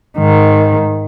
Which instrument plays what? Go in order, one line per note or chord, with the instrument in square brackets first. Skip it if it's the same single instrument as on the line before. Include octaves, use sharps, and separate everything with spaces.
[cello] G#2 D#3